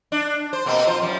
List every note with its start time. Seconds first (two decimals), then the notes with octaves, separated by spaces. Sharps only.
0.12 D4
0.53 C5
0.66 B2 A#3 C4
0.87 F2 F4 C5
1.02 F#2 F3 G3